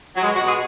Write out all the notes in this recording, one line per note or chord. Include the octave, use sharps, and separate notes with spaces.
F#3
B2 G#3
F#4
B2
G#4